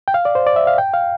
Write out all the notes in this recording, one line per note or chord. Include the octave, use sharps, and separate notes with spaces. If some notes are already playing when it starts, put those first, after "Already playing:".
G5
F5
D5
C5
D5
E5
F5
G5
F5